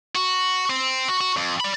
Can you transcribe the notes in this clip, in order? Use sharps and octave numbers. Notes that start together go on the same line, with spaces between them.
F#4
C4
F#4
F#4
F2
D5 B5